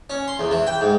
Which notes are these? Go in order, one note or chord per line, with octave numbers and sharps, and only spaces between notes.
C#4
C6
E2
E3
G5
G#2